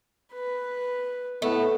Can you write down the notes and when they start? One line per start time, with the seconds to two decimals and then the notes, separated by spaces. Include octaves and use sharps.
0.33 B4
1.42 A2 A3 B3